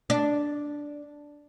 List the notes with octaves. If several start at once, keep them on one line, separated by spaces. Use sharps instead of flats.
D4